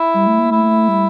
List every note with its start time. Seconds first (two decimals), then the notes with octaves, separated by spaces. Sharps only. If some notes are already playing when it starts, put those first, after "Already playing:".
Already playing: E4
0.14 G3
0.27 A3
0.39 A#3
0.51 A3 E4
0.88 G3